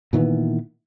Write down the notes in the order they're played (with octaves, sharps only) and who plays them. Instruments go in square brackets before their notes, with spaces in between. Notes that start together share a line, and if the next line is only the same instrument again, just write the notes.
[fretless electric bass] A#2 D#3 E3 B3